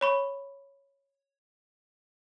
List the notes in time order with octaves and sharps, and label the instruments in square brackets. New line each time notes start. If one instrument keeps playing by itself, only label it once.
[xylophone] C#5 B5 C#6